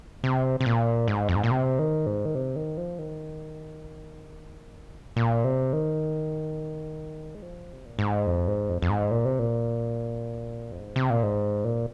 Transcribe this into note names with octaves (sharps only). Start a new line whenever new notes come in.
C3
C3
A#2
G#2
F2
G#2
A#2
C3
D#3
G#2
D#3
C3
D#3
F3
D#3
A#2
C3
D#3
G#3
F3
C3
A#2
G#2
F2
G#2
F2
F2
G#2
A#2
C3
A#2
F2
G#2
C3
A#2
G#2
A#2